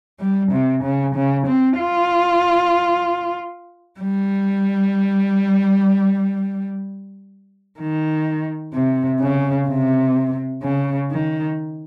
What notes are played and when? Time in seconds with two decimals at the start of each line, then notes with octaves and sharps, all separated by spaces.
0.20 G3
0.52 C3
0.83 C#3
1.15 C#3
1.46 C4
1.78 F4
4.00 G3
7.79 D#3
8.74 C3
9.21 C#3
9.68 C3
10.63 C#3
11.11 D#3